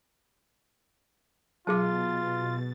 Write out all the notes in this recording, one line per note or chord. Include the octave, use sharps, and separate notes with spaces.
B2 F#3 F4 G#4 A5 D6 A6